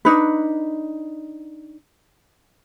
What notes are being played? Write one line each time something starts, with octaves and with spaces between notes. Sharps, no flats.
D4 D#4 B4